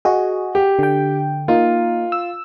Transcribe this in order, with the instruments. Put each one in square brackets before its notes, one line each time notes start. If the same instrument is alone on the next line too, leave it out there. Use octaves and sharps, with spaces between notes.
[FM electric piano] F#4 G#4 [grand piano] D#5
[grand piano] G4
[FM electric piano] D3 G5
[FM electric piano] A#3 D#4 [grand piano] F4
[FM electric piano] E6